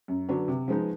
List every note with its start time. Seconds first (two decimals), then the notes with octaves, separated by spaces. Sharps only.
0.08 F#2
0.28 D3 F#3 B3 D4
0.48 C3
0.68 F3 G#3 B3 D#4